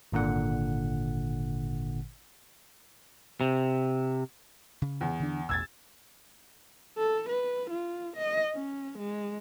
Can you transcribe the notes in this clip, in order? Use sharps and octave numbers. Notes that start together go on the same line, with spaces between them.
G#1 A#2 D3 F#5
C3
C#3
E2
D3 D4
A1 E2 B2 E6 G#6 A6
A4
B4
F4
D#5
C#4
G#3